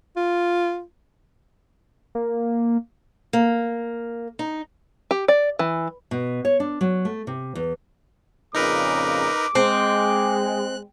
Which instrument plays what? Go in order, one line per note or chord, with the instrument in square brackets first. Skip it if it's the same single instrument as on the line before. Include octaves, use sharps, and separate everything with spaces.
[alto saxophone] F4
[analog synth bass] A#3
[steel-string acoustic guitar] A#3
D#4
[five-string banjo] G4
D5
E3
[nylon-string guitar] B2
C#5
D4
F#3
A3
C3
E2
[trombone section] F2 A#2 C#3 [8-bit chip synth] D#4 A#4 B4 [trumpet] D6
[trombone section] G#3 [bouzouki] C4 [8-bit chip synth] F#6